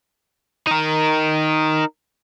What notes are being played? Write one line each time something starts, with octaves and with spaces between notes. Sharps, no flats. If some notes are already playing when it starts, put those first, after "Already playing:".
D#4 A#4